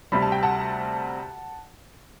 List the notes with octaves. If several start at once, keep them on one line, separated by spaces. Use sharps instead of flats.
D2 C3 G3 B5
A5
G5
F#5 A5